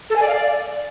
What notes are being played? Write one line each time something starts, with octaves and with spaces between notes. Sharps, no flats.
A4
G#5
D5
F5
D5